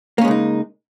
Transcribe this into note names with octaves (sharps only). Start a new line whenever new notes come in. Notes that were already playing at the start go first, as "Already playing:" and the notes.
C#3 G#3 A#3 C#4 D#4